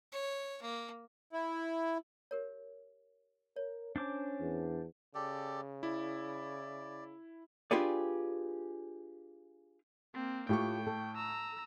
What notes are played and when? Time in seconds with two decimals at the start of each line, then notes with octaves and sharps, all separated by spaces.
0.12 C#5
0.62 A#3
1.33 E4
2.31 G4 A#4 C#5
3.56 A#4 C#5
3.96 C#4 D4 C5 D6
4.40 E2
5.15 C#3 G4 A4 D5
5.83 E4 D5
7.71 D4 F4 G4 G#4 B4 D5
10.14 A#3 C4
10.49 A2 A3 F4 G4 G5 C#6
10.87 A4
11.16 A#5 E6